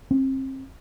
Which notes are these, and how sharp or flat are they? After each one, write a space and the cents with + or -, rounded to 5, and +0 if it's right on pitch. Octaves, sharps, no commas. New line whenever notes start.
C4 +35